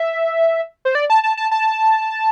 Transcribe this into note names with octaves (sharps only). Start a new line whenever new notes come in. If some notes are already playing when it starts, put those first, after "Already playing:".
Already playing: E5
C5
D5
A5
A5
A5
A5